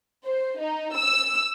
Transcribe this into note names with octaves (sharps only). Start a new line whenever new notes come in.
C5
D#4
E6